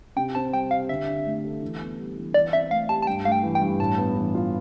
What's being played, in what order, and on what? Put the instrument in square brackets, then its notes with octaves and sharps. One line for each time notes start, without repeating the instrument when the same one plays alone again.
[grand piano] C3 [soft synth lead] G5
[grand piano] C4 [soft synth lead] A5
[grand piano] G3 [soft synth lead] G5
[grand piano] G4 [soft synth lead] F5
[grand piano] D3 [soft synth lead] E5
[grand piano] D4
A3
A4
E3
B3
G3
E3
[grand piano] E3 [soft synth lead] D5
[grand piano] C4 [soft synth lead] E5
[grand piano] A3 [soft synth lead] F5
[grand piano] G4 [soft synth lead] A5
[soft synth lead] A5
[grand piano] G2 [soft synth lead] G5
[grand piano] A3 [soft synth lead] F5
[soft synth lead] G5
[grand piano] E3
[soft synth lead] G5
[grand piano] G2
[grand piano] A2 [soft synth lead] A5
[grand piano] B3
E3
F4